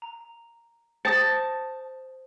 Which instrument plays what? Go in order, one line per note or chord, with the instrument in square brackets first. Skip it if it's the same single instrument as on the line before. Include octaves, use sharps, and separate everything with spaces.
[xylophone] A#5
[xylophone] C5 D#6 A#6 [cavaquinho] A5